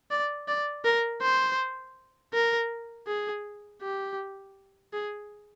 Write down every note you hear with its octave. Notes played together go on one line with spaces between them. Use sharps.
D5
D5
A#4
C5
A#4
G#4
G4
G#4